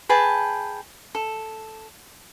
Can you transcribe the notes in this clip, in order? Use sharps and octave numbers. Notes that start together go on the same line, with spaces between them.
G#4 B4 G5 A5
A4